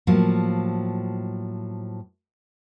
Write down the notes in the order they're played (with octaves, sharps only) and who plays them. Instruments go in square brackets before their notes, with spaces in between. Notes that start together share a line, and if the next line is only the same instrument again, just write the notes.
[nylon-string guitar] A2 F3 F#3 A#3